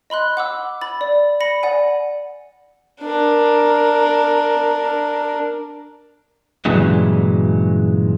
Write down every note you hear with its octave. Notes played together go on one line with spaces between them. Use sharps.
D#5 B5 C6 F#6
F#5 D6 E6
B5 A6
D5
B5 A#6 C#7
D5 F#5 G#5
D4 A#4
G2 A#2 C#3 E3 F#3 G#3